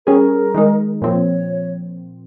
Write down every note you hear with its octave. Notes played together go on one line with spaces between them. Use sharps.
G3 C#4 G#4 A#4
D#3 G#3 D#4
A#2 F3 C4 C#5